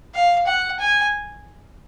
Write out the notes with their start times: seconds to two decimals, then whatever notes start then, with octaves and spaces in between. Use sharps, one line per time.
0.14 F5
0.47 F#5
0.80 G#5